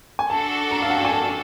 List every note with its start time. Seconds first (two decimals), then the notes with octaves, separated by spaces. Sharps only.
0.19 G#5
0.30 D4 F#4 A4 A5
0.71 A#5
0.83 F5
0.90 F#5
0.97 G5
1.05 G#5
1.12 A5